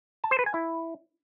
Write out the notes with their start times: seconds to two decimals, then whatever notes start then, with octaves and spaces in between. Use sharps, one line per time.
0.24 A5
0.31 C5
0.39 B4
0.46 G#5
0.54 E4